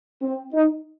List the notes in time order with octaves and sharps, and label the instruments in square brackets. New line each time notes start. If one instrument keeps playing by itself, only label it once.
[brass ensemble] C4
D#4